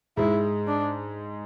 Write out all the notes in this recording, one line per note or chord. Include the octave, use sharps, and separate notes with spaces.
G#2 G#3 E4
D4